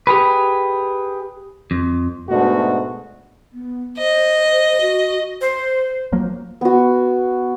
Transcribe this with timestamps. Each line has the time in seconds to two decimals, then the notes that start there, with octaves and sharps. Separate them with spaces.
0.07 G4 G#4 B4
1.71 F2
2.29 G#2 B2 A3 D4 F#4
3.53 B3
3.98 C5 D#5
4.81 F#4
5.41 C5
6.12 F3 F#3 A#3
6.61 B3 F#4